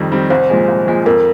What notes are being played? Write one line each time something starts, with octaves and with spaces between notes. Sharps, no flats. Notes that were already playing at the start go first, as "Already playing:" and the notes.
Already playing: F2 D#3 G3 C4
D#3 G3 C4
C2 C5
A#2 F3 G#3
C2
A#2 F3 G#3
F2 A#4